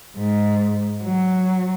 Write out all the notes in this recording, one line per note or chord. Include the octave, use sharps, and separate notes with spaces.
G#2
F#3